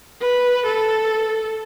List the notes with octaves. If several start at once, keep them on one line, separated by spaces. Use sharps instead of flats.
B4
A4